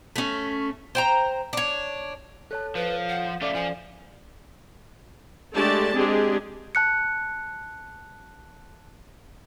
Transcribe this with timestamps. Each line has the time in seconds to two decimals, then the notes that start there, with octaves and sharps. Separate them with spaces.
0.16 A3 C#4
0.95 C5 G5 A#5
1.53 D4 C#5
2.51 A4 C#5 A5 F#6
2.75 F3 B4
3.09 F#5
3.41 A3 C#4 F4 A4 D5 D6
3.54 F3 G#5
5.54 G#3 A3 D4 G4 D5 A5
5.95 G#3 C4 D4 G4 G#4
6.75 A5 F#6 C#7